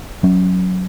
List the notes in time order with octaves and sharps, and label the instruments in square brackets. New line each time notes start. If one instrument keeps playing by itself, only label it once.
[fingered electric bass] F#3 C#4